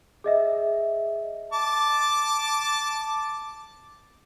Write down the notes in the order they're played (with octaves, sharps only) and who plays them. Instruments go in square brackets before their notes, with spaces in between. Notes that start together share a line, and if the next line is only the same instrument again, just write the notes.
[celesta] G#4 D#5 E5
[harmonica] A5 D6